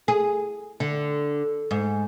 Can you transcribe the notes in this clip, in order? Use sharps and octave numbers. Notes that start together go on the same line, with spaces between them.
G#4
D3
G#2